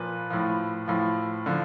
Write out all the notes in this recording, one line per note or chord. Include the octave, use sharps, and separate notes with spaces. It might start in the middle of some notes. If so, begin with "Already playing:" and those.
Already playing: A#2 F3 B4
A2 F3
A2 F3
D3 F3